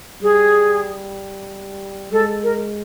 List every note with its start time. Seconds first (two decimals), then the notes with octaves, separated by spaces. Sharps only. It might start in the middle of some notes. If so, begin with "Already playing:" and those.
0.22 G3 G#4
2.12 G#3 A4
2.43 A#4